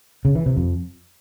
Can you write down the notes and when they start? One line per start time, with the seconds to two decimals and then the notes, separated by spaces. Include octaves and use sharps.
0.25 C#3
0.35 E3
0.46 C3
0.57 F2